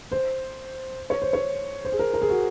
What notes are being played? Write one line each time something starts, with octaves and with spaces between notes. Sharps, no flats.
C5
C#5
C5
C#5
C5
G#4
A#4
A#4
G#4
F#4